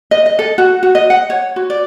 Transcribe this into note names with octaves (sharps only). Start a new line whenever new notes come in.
D#5
D#5
A4
F#4
F#4
D#5
F#5
C#5
F#4
D5